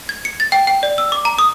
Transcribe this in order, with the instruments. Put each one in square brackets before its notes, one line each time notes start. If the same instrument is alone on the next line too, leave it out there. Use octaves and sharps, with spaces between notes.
[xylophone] G#6
C#7
A6
G5
G5
D5
E6
D6
A#5
D#6